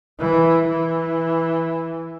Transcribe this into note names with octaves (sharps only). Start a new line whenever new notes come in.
E3
E3